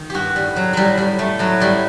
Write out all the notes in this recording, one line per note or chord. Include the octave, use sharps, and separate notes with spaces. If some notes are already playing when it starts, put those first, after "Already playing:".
Already playing: D#3
G2 F#4 G4
A2 G3
A2 F#3
A2 F#3 G3
A2 G3
A2 A3
A2 F#3
A2 G3